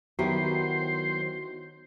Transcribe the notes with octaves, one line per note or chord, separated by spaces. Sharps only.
D#3 F#3 B3 E4 G4 C5